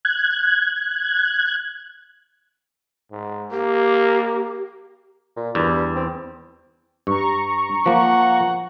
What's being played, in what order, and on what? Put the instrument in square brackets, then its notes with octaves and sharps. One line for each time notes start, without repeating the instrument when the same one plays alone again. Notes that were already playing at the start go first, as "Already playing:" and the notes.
[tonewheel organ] F#6 G#6
[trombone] G#2
[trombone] A#3 [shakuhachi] G4
[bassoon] A#2
[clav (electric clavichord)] E2 [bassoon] G2
[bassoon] C4
[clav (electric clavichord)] G2 [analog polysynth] A#5 C#6
[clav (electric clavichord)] F3 A#3 [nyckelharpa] F#5